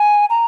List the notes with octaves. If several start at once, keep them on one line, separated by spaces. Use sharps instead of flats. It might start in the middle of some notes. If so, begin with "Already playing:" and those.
Already playing: G#5
A#5